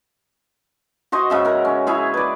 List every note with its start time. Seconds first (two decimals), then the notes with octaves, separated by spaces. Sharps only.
1.12 F#4 C5 D#5 C#6
1.30 G#2 C#3 E5
1.45 A#4 F#5
1.65 C#4
1.87 E4 G#4 C#5
2.14 B4 D5